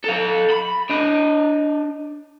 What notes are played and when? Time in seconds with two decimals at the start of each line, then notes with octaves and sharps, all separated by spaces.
0.04 A4 F5
0.51 B5
0.91 D4 D#5